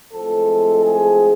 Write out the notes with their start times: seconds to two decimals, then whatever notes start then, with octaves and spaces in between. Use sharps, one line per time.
0.13 A2 F3 G#3 C4 A4
0.85 G#4